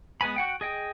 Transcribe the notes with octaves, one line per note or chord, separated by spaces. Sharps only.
G#3 B3 B4 G#5 B5
F#4 F#5 G5
G#4 D#5 G5